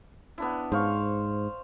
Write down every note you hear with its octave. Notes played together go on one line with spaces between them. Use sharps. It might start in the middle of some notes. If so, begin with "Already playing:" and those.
B3 D4 E4
G#2 C5 F5 C#6